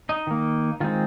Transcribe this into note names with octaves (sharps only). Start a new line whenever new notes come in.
D#4 D#5
D#3 A#3
D#3 G#3 C4 F4